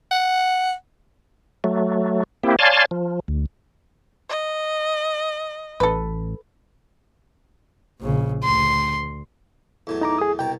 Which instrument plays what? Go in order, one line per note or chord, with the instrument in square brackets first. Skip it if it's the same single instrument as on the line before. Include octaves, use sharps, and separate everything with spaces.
[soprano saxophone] F#5
[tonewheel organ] F#3 A3
A#3 C4 E4 G4
C#5 D5 F5 G#5 A5 C6
F3
D2
[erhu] D#5
[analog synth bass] A1 [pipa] A4 B4
[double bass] A#1 C#3
[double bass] D2 [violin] C6
[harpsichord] E2 A2 F#3
[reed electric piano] D#4 A#5 D6
G#4 D#6
[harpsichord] C2 B2 A#5 [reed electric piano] G5